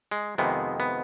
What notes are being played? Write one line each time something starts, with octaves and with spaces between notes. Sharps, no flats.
G#3
F2 C3 D#3 G#3 B3
B3